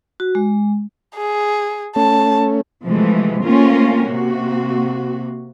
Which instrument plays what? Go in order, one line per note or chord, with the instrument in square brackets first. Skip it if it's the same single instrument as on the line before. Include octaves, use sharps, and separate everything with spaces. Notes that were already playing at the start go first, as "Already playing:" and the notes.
[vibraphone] F#4
G#3
[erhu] G#4
[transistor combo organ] A3 C#4 [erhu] A5
[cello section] C3 E3 F3 G#3 A3
A3 A#3 C4 C#4 F4 A#4
C3 A#3 F#4